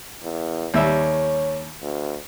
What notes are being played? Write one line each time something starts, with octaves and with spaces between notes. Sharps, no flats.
E2
D#2 G3 C#5 E5
D2